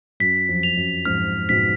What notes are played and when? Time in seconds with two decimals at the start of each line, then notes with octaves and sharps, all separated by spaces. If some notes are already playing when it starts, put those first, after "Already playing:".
0.20 F#2 B6
0.49 F2
0.63 F7
0.77 F#2
1.05 F2 G#2 F6
1.49 G#2 B2 B6